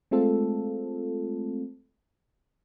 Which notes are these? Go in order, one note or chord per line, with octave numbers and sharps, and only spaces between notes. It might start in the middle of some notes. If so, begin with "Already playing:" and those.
G#3 A3 C4 F4 A4